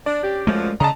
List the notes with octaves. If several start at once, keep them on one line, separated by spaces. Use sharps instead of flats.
D4 D5
C#4 D4 G4
F#2 F3 G#3 A3
C#3 A3 D4 D#5 A5 A#5